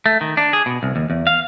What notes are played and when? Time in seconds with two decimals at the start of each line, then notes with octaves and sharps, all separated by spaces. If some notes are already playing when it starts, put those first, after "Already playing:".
0.06 A3
0.21 D#3
0.37 D4
0.53 G#4
0.66 B2
0.83 C2
0.96 D#2
1.10 E2
1.27 F5